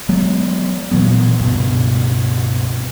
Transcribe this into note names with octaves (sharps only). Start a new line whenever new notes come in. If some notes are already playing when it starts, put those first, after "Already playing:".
F#3 G#3 B3
A#2 E3 F#3 B3
C#2 G2 B2